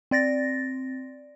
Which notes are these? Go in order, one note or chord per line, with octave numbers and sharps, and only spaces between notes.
C4 D5 A6 A#6